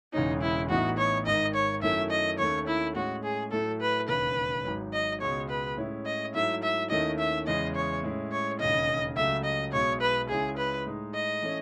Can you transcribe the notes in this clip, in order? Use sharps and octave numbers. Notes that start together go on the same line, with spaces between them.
E1 E2 C#3 G#3 C#4 D#4
E4
A1 A2 E3 B3 D#4 F#4
C#5
G#1 G#2 D#3 D#5
C#5
F#2 D#3 A3 C#4 E4 E5
D#5
D#2 D#3 A3 C#4 C#5
E4
A2 G#3 C#4 F#4
G#4
A2 F#3 A3 E4 A4
B4
E1 D#2 C#3 B4
G#1 G#2 F#3
D#5
C#2 B2 G#3 C#5
B4
A2 G#3 C#4 E4
D#5
G#2 F#3 A3 E4 E5
E5
D#2 D#3 A3 C#4 E4 D#5
E5
E2 C#3 G#3 D#5
C#5
A2 G#3 C#4 E4
C#5
E1 D#2 C#3 D#5
C#2 C#3 F#3 A3 E5
D#5
B1 B2 G#3 C#5
B4
C#2 C#3 G#3 C#4 E4 G#4
B4
A2 G#3 D#4
D#5
E3 A3 C#4